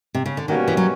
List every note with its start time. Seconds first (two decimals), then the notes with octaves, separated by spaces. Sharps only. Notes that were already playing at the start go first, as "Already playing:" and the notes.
0.14 C3
0.26 C#3
0.37 D3
0.48 B2 D#3 G3 A#3 C#4 F#4
0.68 E3
0.77 F#3